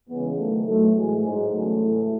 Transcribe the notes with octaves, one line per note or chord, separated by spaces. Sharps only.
E2 C#3 E3 G#3 B3
G#2 D#3 F#3 A3
A2 F#3 A3
A2 E3 G#3
G#2 F#3 G#3
E2 C#3 F#3 A3
A2 E3